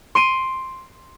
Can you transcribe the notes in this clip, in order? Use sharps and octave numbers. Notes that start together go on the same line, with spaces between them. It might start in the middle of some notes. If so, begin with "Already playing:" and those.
C6 D7 D#7